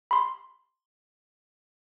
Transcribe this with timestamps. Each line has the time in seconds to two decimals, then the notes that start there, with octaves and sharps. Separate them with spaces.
0.11 B5 C6